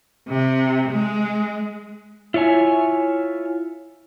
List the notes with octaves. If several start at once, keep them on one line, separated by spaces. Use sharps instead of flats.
C3
G#3
E4 F4 C#5 E5 G#5